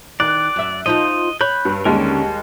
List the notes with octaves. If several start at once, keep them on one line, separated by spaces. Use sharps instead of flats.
D#3 D5 F#6
F#2 E5
F3 D#4 F4 D#5
C#5 B5 F#6 G6
G2
D#2 D3 G3 G#3 C#4 A#4